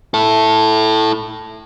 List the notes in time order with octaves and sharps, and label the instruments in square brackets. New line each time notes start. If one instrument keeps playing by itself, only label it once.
[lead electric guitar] E4 A4